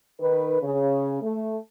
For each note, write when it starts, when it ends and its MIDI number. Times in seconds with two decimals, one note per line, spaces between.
0.19 0.58 51
0.19 0.58 71
0.61 1.20 49
1.21 1.57 57